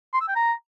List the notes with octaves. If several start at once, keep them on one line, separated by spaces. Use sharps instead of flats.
C6
E6
G5
A#5